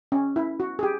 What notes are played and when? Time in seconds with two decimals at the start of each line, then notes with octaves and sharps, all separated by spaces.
0.12 C#4
0.36 E4
0.60 F#4
0.79 G#4
0.83 G4